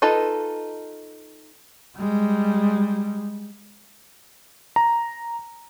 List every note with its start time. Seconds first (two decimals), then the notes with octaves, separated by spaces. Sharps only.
0.02 D#4 F4 A4 B4 D#5
1.97 G3 G#3
4.76 A#5